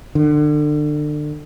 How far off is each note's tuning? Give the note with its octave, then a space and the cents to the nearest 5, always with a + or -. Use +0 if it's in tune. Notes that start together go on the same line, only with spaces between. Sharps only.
D3 +30